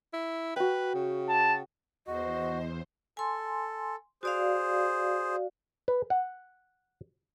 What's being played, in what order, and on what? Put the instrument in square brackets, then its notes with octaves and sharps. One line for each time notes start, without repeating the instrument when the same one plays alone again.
[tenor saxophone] E4
[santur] F#4 G5 [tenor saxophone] B4
[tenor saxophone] C#3
[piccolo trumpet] A5
[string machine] E2 C5 [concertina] F#4 [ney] D#5
[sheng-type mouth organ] A4 [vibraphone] G#5 C6
[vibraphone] F#4 D5 F5 [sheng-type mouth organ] G#4 C5
[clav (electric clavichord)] B4
F#5